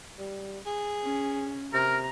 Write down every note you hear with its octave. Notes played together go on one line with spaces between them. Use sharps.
G3
G#4
C#4
C3 A#4 A#5